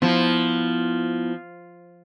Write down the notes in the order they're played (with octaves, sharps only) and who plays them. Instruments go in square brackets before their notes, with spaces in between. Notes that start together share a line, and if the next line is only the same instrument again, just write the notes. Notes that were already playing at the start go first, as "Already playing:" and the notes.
[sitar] F3 [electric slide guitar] B3 E4 F4